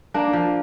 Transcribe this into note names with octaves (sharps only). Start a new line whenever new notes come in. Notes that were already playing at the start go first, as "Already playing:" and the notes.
A#3 D4
F3